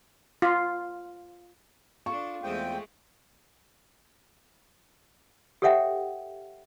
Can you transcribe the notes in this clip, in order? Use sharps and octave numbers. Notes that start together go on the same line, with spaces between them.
F4
D4 F4 A4 C#6
E2 G#3 A3 C4 G5
G4 A4 C#5 E5 F#5 G5